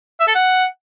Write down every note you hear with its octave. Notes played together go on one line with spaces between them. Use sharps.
E5
A4
F#5